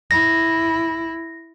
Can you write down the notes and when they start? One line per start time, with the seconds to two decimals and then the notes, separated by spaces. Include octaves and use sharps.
0.11 E4 A#6